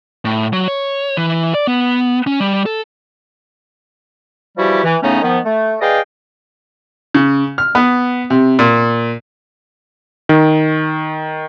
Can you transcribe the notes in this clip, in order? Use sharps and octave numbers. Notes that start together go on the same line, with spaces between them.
A2
F#3
C#5
E3
D5
B3
C#4
G3
A4
E3 F3 G3 E4 F#4 G4
E3
A2 C#3 A3 B3 C#4 D#4
D#3 F3 B3
A3
G#4 B4 D5 D#5 F5 G5
C#3
F6
B3
C3
A#2
D#3